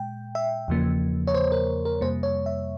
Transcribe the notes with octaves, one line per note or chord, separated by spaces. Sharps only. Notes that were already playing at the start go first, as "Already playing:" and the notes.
Already playing: A#2 G#3 G5
E5
E2 C#3 F3 A#3
C#5
C5
A#4
A#4
F2 C3 G3 A#3 C5
C#5
E5